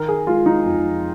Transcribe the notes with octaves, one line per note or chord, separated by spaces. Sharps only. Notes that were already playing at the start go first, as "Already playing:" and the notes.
Already playing: D#3 A#4
G#4
G#3 F4
D#4
F2